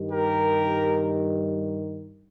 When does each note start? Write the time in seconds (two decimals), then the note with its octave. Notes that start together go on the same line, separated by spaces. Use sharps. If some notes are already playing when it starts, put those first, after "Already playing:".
Already playing: G2 D#3 G3
0.10 G4 A#4